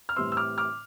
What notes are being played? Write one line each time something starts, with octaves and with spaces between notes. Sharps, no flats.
F6
A2 E3 G3 C4 C6 E6
E6
D6 F6
D6 F6